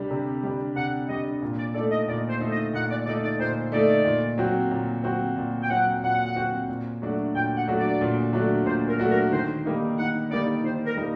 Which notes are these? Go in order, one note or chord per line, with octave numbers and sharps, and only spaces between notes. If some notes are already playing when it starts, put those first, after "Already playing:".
Already playing: C3 G3 D4
C3
G3 D4
C3 F#5
G3 D4 D#5
A#2
D5
A3 D#4 A4 D5
D#5
A#2 D5
C5
A3 D#4 A4
D#5
A#2 F#5
D5
A3 D#4 A4 D5
D5
A#2 C5
A3 D#4 A4 D5
A#2
F#3 C4 F#4
A#2
F#3 C4 F#4
A#2
G5
F#3 C4 F#4 F#5
A#2 F#5
F#3 C4 F#4
A#2
F#3 A3 D4 F#4
A#2 G5
F#5
F#3 A3 D4 F#4
D5
A#2
F#3 A3 D4 F#4
A#2 C5
A#4
F#3 A3 D4 F#4
A#4
D#3 C5
G3 A#3 D#4
D#3 F#5
G3 A#3 D#4 D5
D#3 C5
A#4
G3 A#3 D#4